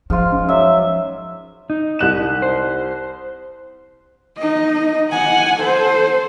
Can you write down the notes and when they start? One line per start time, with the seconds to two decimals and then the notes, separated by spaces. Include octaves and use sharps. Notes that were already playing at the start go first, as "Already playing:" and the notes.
0.10 G#2 F3 F4 F6
0.32 C#4
0.49 F#2 C#5 E5
1.70 D#4
1.99 C2 F#6 E7
2.42 C5
4.38 D#4 D#5
5.11 F#5 G#5
5.60 A4 C5